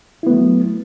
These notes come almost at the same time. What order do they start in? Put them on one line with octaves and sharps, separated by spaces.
E4 B3 A3 F#3